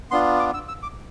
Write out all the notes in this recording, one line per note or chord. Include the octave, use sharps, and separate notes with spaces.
B3 D4 F4 C6
D6
E6
E6
D6